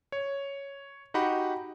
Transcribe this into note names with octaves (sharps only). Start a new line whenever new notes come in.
C#5
D#4 F#4 G4 F#5 B5